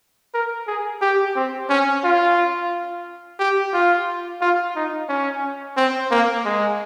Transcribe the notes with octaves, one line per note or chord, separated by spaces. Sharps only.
A#4
G#4
G4
C4
C#4
F4
G4
F4
F4
D#4
C#4
C4
A#3
G#3